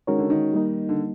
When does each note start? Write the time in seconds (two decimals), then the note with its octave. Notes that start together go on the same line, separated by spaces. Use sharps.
0.07 D#3 G#3 C#4 F#4 A#4 C#5
0.19 D3
0.30 D#3
0.53 G3 A#3 D#4
0.89 D3